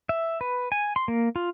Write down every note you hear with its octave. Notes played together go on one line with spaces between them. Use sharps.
E5
B4
G#5
C6
A#3
F4